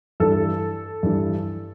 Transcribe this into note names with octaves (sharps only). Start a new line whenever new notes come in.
G2 E3 A4
G2 E3